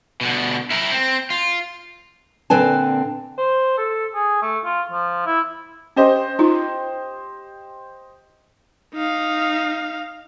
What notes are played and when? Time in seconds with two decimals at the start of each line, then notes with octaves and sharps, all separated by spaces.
0.21 B2 D3
0.71 E4 A#4
0.92 C4
1.30 F4
2.50 A#2 D3 C4 B4 G#5 A5
3.38 C5
3.78 A4
4.15 G#4
4.42 A3
4.65 F4
4.91 F3
5.26 E4
5.96 C#4 G4 C5 D#5
6.39 D#4 F4
8.94 D#4 F5